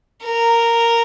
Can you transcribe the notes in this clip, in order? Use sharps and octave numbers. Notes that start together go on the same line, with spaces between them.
A#4